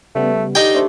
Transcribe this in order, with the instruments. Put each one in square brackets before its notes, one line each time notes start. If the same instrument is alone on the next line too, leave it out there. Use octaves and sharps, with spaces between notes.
[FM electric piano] C#3 G3 B3 [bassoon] A3
[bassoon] D3 [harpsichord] D#4 G5 [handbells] G4
[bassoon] A3 [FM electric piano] D4 C5